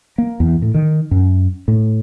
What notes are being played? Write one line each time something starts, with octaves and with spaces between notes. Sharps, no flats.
A#3
E2
A2
D#3
F#2
A2